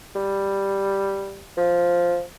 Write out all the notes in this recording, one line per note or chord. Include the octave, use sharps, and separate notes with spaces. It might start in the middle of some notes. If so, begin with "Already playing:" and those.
G3
F3